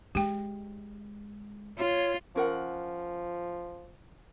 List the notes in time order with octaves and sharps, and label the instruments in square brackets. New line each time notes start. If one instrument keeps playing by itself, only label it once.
[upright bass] G#3 [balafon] G4 G5
[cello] F4 [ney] C#5
[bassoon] F3 [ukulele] C#4 A#4 F#5